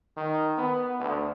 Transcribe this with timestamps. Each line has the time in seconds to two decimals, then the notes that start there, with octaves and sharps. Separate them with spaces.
0.17 D#3
0.58 B3
1.00 D2